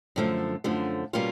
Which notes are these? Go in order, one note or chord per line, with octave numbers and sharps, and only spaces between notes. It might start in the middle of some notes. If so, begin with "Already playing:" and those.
F#2 D3 F3 A3
F#2 D3 F3 A3
B2 G3 A#3 C#4 F4